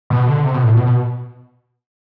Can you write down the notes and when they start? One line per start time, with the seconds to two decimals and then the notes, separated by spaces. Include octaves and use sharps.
0.10 B2
0.27 D3
0.44 C3
0.54 B2
0.64 A2
0.75 B2
0.86 B2